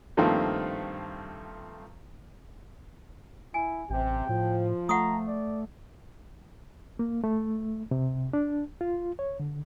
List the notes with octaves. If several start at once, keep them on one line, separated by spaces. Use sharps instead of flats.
G2 D#3 F3 A3 A#3 C4
E4 G#5
A1 C3 G4 G5
A2 F3
A3 F#5 A#5 C#6 D#6
D5
A#3
A3
C3
D4
F4
C#5
D3